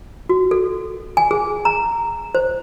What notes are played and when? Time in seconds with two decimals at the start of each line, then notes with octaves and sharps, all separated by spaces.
0.29 F#4
0.51 A4
1.17 G#5
1.31 G#4
1.65 A#5
2.35 C5